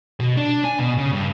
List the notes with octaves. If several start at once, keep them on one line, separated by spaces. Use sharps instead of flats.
B2
D4
G#5
B2
C#3
G2